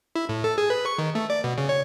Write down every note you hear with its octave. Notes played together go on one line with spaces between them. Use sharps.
E4
A2
A4
G#4
B4
C#6
D#3
A3
D5
B2
C#3
C#5